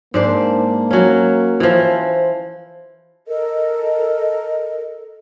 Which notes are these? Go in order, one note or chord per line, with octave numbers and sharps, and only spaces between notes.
G#2 A#3 D4 C5
F#3 C#4
E3 F3
C5
A4 A#4 D#5